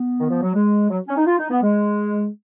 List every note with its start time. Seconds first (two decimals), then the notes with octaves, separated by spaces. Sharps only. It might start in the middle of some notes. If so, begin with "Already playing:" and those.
Already playing: B3
0.20 D#3
0.31 F3
0.43 F#3
0.55 G#3
0.90 F#3
1.08 C#4
1.17 D#4
1.26 F4
1.38 D#4
1.50 B3
1.62 G#3